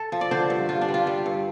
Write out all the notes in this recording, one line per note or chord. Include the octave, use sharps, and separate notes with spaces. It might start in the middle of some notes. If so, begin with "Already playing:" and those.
Already playing: A4
F3
D5
D3 C5
G2
G2 F4
D4
G3
F4
G3
G2